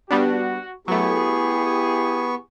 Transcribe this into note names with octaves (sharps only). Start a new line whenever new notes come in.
G3 B3 D4 F#4
F#3 A3 B3 E4 G4 G#4 C#6